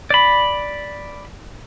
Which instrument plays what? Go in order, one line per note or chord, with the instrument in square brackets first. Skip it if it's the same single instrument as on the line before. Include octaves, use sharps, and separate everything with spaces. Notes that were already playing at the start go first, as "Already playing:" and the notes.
[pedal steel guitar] D5 B5